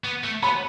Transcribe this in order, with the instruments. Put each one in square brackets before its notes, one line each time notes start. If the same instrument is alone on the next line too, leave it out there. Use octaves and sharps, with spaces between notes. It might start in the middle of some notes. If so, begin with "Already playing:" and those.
[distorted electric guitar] B3
A3
[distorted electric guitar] B3 [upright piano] B5